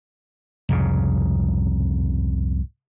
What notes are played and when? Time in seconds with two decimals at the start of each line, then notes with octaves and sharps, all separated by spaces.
0.69 C2 F2 G#2 C#3